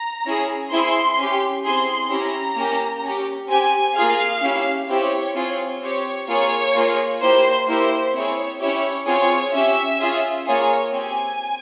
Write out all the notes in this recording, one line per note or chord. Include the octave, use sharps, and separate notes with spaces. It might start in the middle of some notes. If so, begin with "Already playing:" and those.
Already playing: A#5
C#4 E4 G#4
C4 E4 G#4 C6
C#4 G4
C4 E4 G#4 C6
C#4 E4 G4 A#5
A#3 C#4 G4
C#4 G4
C4 G4 G#5
A#3 F4 G#4 F5
C#4 E4 G4
C4 E4 G4 C#5
C4 F4 G#4
C4 G4 C#5
A#3 F4 G#4 C#5
A#3 F4 G#4
A#3 E4 G4 C5
A#3 E4 G4 C5
C4 E4 G#4 C#5
C#4 E4 G4 C#5
C4 F4 G#4 C#5
C#4 G4 E5
C#4 F4 G#4
A#3 F4 G#4 C#5
C4 G4 G#5